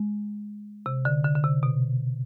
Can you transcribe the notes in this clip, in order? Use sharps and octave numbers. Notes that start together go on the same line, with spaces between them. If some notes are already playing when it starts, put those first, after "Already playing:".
Already playing: G#3
C3
D3
D3
D3
C3
B2